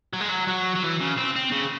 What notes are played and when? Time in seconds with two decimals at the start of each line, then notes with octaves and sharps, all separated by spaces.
0.13 F#3
0.21 G#3
0.29 F#3
0.48 F#3
0.76 F#3
0.84 E3
1.01 C#3
1.18 C4
1.36 C4
1.52 C#3